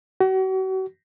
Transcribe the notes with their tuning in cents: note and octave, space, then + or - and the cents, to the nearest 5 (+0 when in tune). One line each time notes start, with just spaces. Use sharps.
F#4 +40